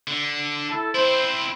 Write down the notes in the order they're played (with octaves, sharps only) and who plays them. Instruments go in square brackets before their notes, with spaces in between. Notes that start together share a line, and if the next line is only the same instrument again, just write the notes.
[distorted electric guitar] D3
[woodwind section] E4 A4 A5
[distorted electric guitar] C4 E4 [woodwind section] C5